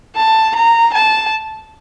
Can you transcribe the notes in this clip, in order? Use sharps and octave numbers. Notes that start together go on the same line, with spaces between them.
A5
A#5
A5